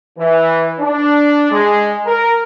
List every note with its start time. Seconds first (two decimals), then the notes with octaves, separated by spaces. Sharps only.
0.18 E3
0.80 D4
1.51 G#3
2.07 A#4